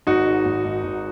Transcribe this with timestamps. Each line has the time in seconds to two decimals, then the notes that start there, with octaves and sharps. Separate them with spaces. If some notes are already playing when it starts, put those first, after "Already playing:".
0.07 G#1 D#4 F#4
0.26 G#2
0.45 G#1
0.65 G#1
0.83 G#1